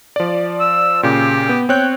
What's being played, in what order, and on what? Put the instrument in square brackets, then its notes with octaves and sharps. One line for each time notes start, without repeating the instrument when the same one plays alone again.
[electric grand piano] F3 D5
[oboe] E6
[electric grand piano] A#2 C#3 [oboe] G4
[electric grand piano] B3
[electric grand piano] C4 C#5 F#6 [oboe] G5